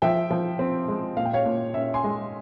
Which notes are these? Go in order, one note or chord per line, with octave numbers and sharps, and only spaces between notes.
F3 E5 G5
F3
C4
G#3
A#2 F5
G5
C#5 F5
A#2
C#4 E5
G#5 C6
G#3